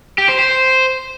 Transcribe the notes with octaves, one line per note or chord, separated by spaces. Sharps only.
G4
C5
C5